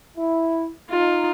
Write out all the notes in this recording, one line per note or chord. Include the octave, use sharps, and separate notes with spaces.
E4
D#4 F4